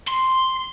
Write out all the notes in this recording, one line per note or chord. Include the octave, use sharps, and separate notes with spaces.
C6